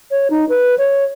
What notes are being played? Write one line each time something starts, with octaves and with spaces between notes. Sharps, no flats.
C#5
D#4
B4
C#5